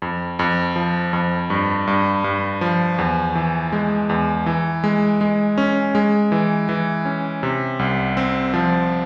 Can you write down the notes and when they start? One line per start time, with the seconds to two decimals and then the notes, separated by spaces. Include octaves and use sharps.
0.02 F2
0.39 F2
0.76 F3
1.13 F2
1.50 G2
1.87 G2
2.24 G2
2.61 F3
2.99 E2
3.35 E3
3.72 G#3
4.09 E2
4.46 E3
4.84 G#3
5.21 G#3
5.58 C#4
5.95 G#3
6.32 E3
6.69 E3
7.05 C#4
7.43 C3
7.79 C2
8.17 C4
8.54 F3